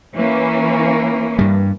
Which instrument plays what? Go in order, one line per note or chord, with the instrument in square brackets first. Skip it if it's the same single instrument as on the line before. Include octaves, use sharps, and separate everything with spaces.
[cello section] E3 A#3 C#4
[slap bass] G2 G3